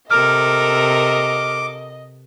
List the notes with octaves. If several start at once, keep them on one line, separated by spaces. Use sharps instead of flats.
C3 A4 A#4 D#5 D6 F6